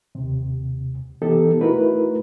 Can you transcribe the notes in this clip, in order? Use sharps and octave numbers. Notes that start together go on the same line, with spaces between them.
D#2 C3
E3 B3 D#4 G4 A4
A3 D#4 E4 F#4 A#4 B4